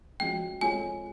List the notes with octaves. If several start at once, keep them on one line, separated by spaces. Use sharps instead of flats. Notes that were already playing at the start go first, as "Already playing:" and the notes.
F3 G#3 C#4 F#4 G5
G#3 C4 F4 A4 C#5 G#5